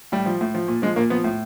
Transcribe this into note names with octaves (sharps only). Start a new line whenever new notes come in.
A2 G3
F3
A2
F3
A#2
F3 G#3
A#2 A#3
F3 B3
A2